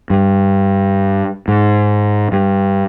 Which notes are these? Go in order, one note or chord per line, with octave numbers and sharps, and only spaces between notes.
G2
G#2
G2